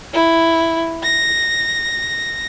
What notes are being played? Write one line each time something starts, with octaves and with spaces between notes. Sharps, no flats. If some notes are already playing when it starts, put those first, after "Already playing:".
E4
A#6